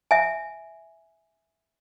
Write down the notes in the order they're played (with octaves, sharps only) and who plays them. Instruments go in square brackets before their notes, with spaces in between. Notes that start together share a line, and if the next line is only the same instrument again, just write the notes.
[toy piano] E5 G#5